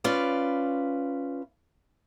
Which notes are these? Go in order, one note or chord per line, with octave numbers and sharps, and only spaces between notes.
C#4 F4 B4 D5